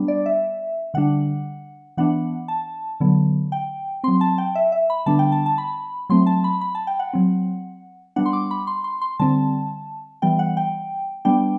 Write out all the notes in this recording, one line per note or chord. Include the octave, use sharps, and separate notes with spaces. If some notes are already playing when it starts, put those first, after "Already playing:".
Already playing: G3 B3 D4
D5
E5
D3 G3 D4 F#5
E3 B3 D4 F#5
A5
D3 F#3 B3
G5
F#3 C4 C6
A5
G5
E5
E5
B5
D3 G3 B3 D4 A5
G5
A5
A5
B5
F#3 A3 C4 C6
A5
B5
B5
A5
G5
F#5
F#3 C4
G3 B3 D4 F#5
C6
D6
B5
C6
C6
C6
D3 G3 C4 A5
E3 G3 B3 G5
F#5
G5
G3 B3 D4 G5